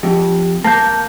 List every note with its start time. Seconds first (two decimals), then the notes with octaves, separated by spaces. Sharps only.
0.03 F2 G4
0.64 A#3 A5 G6